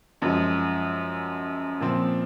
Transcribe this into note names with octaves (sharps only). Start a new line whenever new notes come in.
F#2 F3 G#3
A#2 F3 C4